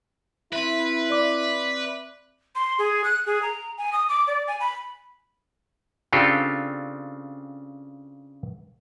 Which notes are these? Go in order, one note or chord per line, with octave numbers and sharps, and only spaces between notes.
C4 E4 B4 E5
D5 D6
C6
G#4
F#6
G#4
A#5
G#5
D#6
D6
D5
G#5
B5
C#3 C4 D4 F4 G4 A4